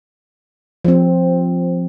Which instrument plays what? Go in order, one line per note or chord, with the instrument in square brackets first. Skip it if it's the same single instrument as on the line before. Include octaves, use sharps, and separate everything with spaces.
[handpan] F3 C4